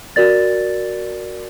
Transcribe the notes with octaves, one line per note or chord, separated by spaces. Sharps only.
F#4 A#4 D5 A6